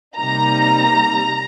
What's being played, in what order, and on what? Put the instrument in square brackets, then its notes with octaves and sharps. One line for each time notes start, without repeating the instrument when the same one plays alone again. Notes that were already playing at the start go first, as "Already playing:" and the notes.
[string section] C3 G3 A#3 D#4 A#5